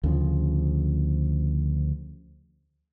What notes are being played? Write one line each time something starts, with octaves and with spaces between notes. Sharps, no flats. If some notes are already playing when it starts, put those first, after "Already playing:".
D2 C#3 F3